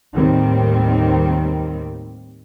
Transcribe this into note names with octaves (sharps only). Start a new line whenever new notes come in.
D#2 A2 D#3 G3 C4